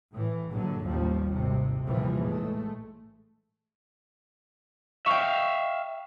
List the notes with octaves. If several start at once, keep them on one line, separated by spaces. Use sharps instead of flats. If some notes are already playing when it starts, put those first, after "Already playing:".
A2 E3
A#1 G2 D3 F#3
A1 D#2 F3 G3
G#1 C3
A#1 D#2 C3 E3 F3 G3
A2 G#3 A3
E5 F5 G5 C#6